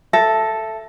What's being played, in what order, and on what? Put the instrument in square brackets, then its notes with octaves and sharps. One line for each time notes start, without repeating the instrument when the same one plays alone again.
[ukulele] A4 [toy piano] E5